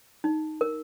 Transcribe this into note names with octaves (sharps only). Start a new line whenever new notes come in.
D#4
A#4